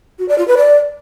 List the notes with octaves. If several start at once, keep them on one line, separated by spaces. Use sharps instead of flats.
F#4
D5
F4
B4
D5